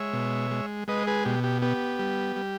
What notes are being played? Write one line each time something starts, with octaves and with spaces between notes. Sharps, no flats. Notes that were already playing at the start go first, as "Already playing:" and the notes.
Already playing: G#3 C#5 E5
B2
G#3
G#3 B4 D#5
G#4 B4
B2 G4
G4
B3 G4
G3
G3